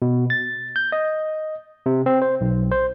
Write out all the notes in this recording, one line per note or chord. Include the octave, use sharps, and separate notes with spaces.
B2
A6
G6
D#5
C3
C4
C5
B1
C5